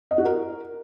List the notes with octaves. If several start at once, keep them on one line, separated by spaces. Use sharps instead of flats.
D#5
F#4
A#4